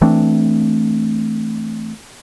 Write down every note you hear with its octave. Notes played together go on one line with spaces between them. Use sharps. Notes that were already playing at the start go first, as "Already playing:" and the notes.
E3 A3 C4 D4